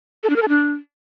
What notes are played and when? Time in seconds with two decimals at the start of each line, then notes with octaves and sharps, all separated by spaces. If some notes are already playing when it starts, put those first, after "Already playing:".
0.23 A4
0.30 D4
0.36 A#4
0.42 A4
0.49 D4